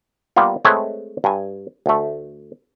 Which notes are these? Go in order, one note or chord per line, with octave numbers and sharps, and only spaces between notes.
G3 A#3 B3 F4
G#3 A3 C4 B4 C#5 G#5
G2 G#5
D2 A3